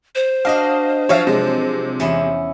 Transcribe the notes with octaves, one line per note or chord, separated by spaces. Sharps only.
C5
D4 F#4 D#5 F5
F3 F#3 C#5 E5 F5
C3 G#3
E2 C#4 E4